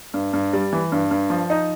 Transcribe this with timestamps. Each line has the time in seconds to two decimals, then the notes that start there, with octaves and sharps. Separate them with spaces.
0.14 G2
0.33 G2
0.53 G3
0.73 E3
0.92 G2
1.11 G2
1.30 F3
1.50 D#4